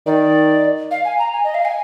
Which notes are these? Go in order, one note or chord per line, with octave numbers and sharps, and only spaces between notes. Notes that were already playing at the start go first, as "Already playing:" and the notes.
D#3 D5
F5
G#5
A#5
G#5
D#5
F5
G#5